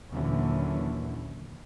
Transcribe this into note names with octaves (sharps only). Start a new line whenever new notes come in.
D#2 A#2 D3 E3 F#3 C#4